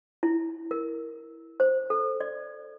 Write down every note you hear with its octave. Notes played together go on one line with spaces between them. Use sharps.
E4
A#4
C5
A4
D5